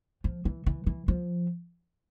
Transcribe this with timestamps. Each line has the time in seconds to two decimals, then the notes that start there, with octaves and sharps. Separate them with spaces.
0.24 F3
0.45 E3
0.66 E3
0.86 E3
1.08 F3